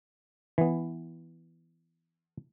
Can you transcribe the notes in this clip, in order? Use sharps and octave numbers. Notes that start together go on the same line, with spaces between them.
E3 B3